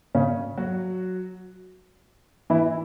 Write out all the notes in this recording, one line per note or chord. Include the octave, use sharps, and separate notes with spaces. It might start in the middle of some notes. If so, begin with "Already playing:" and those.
C#3 C#4
F#3 F#4
E3 E4